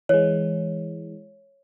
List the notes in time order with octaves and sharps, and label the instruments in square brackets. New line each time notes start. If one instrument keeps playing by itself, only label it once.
[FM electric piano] E3 G#3 [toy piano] C#5